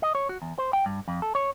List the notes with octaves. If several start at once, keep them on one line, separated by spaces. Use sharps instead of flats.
D#5
C#5
F#4
E2
C5
G5
G2
F2
A4
C#5